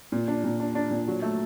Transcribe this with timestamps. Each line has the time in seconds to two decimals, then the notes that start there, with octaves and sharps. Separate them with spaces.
0.12 A#2
0.28 D4
0.44 A#2
0.60 D4
0.75 D4
0.91 A#2
1.08 F#3
1.22 A3